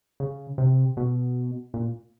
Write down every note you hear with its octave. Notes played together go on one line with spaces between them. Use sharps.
C#3
C3
B2
A#2